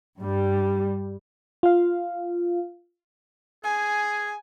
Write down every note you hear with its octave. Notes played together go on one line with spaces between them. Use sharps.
G2 G3
F4 F5
G#4 G#5